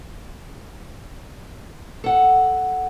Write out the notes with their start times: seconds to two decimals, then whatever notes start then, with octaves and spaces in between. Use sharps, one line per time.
2.04 A4 F#5